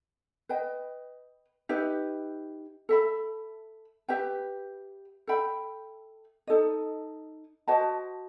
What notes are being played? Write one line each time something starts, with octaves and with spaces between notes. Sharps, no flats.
B4 D#5 G5
D#4 G4 B4 E5
A4 E5 B5
G4 B4 E5 G5
A4 E5 G5 B5
D#4 A4 D#5
F#4 C5 D#5 A5